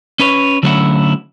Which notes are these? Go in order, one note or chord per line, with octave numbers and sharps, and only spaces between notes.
C#4 B4 C#5
D3 F#3 A3 C#4 E4 F#5